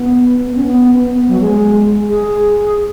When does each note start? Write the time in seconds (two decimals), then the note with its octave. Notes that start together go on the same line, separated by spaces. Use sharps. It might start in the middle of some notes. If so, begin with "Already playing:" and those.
Already playing: B3
0.47 B3
0.56 C#4
0.64 B3
1.01 B3
1.15 B3
1.28 F#3
1.41 G#3
2.09 G#4